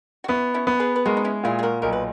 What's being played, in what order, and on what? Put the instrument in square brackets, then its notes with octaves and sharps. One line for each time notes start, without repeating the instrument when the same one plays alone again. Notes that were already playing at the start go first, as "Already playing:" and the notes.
[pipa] F#4
[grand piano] B3 [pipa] C#4 E4
[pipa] C#4 E4
[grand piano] B3
[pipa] G#4 B4
B4
[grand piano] G#3 [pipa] F#4 A#4
[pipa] D#4
C#4 E4
[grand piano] A#2 [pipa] E4 G#4
[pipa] G#4
F#4 A#4
[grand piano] B1 [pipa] A#4
[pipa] B4